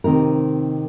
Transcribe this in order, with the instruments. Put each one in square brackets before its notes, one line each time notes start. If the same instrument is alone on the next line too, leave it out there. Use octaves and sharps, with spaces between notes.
[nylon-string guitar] C3 D#3 C4 D#4 A#4